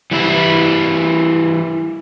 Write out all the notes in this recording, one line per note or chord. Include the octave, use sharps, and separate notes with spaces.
E3 G3 E4